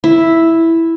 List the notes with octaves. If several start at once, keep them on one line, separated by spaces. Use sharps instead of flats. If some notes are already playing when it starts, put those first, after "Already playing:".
E4